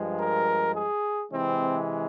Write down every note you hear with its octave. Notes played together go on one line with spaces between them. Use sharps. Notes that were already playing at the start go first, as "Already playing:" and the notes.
Already playing: G2 F3 G#3
A#4
G#4
C3 E3 G#3 C4